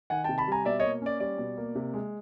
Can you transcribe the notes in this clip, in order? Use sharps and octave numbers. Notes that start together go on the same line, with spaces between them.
D#3 F#5 G#5
C3 G5 A5
A5 B5
G3 G#5 A#5
B2 D5 E5
A#3 C#5 D#5
C#4 D5
G3 D5
B2
A#3
C3
G#3